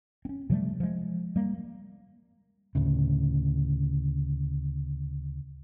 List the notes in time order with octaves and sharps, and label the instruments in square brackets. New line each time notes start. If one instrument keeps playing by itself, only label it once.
[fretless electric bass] C4 C#4
C3 F3 G3 A3
F3 G#3
G3 A#3
[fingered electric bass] D2 A2 C#3